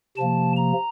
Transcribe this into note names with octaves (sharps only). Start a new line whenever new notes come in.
C3 F3 A#3 A5
A#5